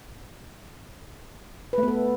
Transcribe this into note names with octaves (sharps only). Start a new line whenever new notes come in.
A3 B3 A4 B4